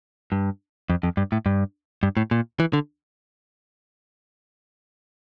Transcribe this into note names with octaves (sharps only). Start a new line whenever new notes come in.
G2
F2
F2
G2
A2
G2
G2
A2
A#2
E3
D3